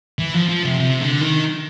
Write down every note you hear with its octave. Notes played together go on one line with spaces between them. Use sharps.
E3
F3
F3
C3
C3
D3
D#3